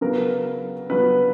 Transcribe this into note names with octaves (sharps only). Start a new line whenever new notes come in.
C#3 F#3 B3 A#4
C#3 F#3 B3 B4